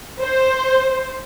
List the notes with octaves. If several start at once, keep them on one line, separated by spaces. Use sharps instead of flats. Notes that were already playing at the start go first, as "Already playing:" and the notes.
C5